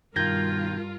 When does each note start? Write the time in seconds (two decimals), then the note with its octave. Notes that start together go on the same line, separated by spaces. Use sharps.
0.16 G2 B2 D#3 F4 A#4 G6 G#6 A#6